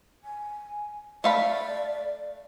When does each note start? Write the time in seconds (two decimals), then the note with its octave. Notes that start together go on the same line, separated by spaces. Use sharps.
0.24 G#5
1.24 A3 D5 F5 B5